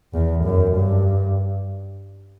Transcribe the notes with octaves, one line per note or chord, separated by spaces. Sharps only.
E2
F#2
G2